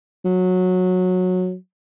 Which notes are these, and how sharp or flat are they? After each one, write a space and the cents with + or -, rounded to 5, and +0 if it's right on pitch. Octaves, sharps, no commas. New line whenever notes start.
F#3 -15